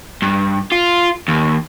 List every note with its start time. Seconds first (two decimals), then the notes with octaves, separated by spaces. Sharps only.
0.22 G2
0.72 F4
1.28 D#2